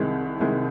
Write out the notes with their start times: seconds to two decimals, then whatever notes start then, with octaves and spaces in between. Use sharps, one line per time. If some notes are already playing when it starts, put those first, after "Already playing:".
Already playing: C2 C3 D#3 G#3
0.40 C2 C3 D#3 G#3